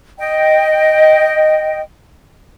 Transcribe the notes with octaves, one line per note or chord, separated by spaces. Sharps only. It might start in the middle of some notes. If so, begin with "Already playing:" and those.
D#5 G5